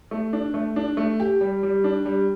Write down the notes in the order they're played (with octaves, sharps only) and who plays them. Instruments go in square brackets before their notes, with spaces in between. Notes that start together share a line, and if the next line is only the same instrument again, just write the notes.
[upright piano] A3
D4
A3
D4
A3
G4
G3
G3
D4
G3